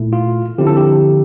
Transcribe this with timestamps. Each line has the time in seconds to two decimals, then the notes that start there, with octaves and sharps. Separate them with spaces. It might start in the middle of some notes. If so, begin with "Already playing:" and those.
Already playing: A#2 A3 E4
0.13 F4
0.58 D3 F3 C4 E4 G4
0.67 A4
0.77 G4